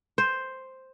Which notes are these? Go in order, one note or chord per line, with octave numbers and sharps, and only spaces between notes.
C5